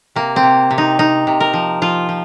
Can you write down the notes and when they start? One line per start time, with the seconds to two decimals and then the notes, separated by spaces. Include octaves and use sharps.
0.16 C3 A#3
0.36 C4
0.43 C3
0.71 C3
0.78 D#4
0.99 C3 D#4
1.27 C3
1.40 A#4
1.54 F3
1.82 F3 F4
2.09 F3